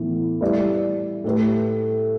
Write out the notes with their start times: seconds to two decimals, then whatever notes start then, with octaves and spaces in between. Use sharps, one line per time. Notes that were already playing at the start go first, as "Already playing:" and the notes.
Already playing: A2 E3 B3
0.41 G3 E4 B4 D5
1.24 A2 A3 G4 B4